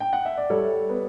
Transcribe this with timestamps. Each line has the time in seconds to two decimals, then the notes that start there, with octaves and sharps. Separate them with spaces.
0.00 G5
0.13 F#5
0.25 E5
0.37 D5
0.50 G3 A4 C#5
0.89 B3